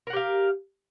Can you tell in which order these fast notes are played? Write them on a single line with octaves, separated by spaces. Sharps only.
A#4 F#5 G4 F5